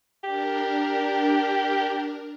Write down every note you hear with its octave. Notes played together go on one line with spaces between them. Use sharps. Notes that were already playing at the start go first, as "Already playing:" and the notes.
D4 G4 A#4